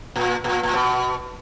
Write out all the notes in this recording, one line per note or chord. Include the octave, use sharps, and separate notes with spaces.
A#2
A#2
A#2
B2